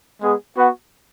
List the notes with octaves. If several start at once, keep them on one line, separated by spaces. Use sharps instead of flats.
G#3 B3 G#4
B3 F#4 B4 F#5